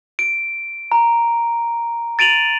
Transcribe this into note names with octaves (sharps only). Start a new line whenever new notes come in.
D7
A#5
A6 D7 D#7 F7 F#7